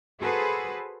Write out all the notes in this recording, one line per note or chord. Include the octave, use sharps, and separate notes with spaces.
F#4 G#4 A4 B4 C5